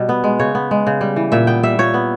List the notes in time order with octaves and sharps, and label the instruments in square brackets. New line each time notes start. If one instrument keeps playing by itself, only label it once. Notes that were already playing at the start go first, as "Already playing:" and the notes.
Already playing: [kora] B2 G3
B3
G#3
C#3 C#5
B3
G#3
C#3
G3
E3
A#2 E5
B3 G5
G3 E5
A#2 C#5
B3